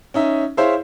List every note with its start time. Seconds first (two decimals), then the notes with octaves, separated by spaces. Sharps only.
0.14 C#4 D#4 E5
0.57 E4 G#4 C5 C#5 E5 F5